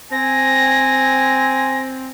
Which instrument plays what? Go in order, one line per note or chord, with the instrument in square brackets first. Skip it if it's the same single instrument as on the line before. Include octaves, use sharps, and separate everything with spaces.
[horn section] C4 [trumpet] G#5 [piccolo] A#6